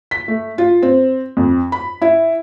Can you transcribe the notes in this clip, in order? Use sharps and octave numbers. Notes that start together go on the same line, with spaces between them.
B6
A3
F4
C4
F2
B5
E4